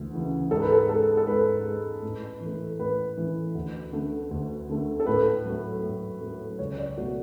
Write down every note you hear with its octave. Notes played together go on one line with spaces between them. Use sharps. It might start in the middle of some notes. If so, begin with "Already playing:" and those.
Already playing: D2 E3
C#3 E3
G#2 A4
B4
A4
G#3 A4
A4
G#2 B4
G#3
A2
E3
A3
A2 B4
E3 A3
D2
D3 A3
D2
D3 A3
A4
A2 B4
F#3 A3
A2
F#3 A3
C#2 C#5
D5
B2 F#3 A3 F#4